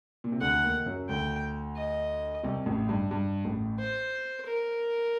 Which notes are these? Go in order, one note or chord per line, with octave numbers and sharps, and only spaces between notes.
A#2
C3
D2 D3 F#5
D#2 D#3
F#2 F#3
D2 D3 G5
D#5
C2 C3
A1 A2
G2
G2
A1 A2
C5
A#4